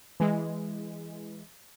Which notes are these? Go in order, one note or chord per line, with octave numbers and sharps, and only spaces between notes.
E3 G#3